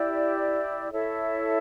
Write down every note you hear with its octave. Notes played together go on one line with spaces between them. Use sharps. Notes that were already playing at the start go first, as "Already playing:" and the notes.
Already playing: E4 G4 D5
E4 A4 C#5 E5